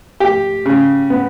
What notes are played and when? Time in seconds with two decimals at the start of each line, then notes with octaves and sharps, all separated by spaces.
0.20 G4
0.66 C#3
1.10 B3